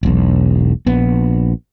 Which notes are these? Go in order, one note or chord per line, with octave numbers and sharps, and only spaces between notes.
E1 B1
A#1 B3